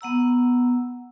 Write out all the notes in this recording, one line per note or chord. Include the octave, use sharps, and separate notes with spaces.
B3 F#5 A#5 E6